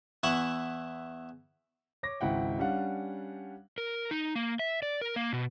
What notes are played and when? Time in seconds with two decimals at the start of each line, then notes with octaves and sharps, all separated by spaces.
0.23 E2 E4 E5 F#5 C#6
2.03 C#5 D6 A#6
2.21 G#1 C#2 E4 F#5 G5
2.59 G3 C#4 D4 F5 F#5
3.78 A#4
4.11 D#4
4.35 A#3
4.59 E5
4.82 D5
5.02 A#4
5.16 A#3
5.33 B2